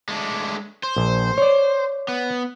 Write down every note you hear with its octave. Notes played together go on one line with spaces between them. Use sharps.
G#3 A3 D4
C5
A#1
C#5 D5
B3